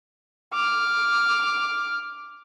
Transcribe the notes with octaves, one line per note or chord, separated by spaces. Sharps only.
D6 F6